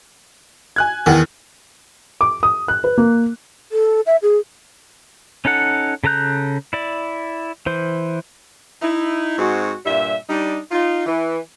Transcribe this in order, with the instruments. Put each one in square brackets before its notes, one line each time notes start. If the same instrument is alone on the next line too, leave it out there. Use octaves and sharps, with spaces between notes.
[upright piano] G#5 F#6 G#6
[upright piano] E2 F#5 [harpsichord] D#3
[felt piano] D6
D#6
F#6
B4
A#3
[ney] A4
E5
G#4
[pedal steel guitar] C#4 D#4 A4 F#5
C#3 A4 A#5 F#6 G6
E4 D5
E3 C5
[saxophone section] D#4 E4
G#2 G#3 C4 F#4
G2 A#2 G3 E5
G3 D4 D#4
D#4 F4
E3